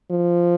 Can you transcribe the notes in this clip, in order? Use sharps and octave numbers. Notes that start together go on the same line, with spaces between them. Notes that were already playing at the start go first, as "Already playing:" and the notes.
F3